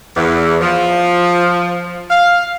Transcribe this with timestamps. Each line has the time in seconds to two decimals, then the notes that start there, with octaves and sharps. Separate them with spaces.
0.16 E2
0.61 F3
2.10 F5